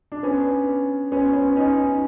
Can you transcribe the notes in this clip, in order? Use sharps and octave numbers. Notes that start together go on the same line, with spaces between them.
D4
B3 C#4
B3 C#4
B3 C#4
C#4 D#4